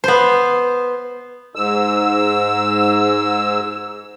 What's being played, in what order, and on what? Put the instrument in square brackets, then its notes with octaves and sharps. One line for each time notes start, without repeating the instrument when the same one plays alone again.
[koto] B3 C5
[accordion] G#2 E6